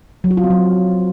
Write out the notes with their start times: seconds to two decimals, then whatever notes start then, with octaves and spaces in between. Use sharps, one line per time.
0.24 F#3
0.31 F#4
0.37 F4
0.44 C4
0.50 F#3